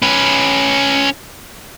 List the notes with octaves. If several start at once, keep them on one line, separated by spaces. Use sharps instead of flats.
C#4 B4